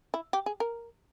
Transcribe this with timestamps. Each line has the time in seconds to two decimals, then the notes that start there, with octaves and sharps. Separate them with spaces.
0.14 E4
0.33 G4
0.46 G#4
0.60 A#4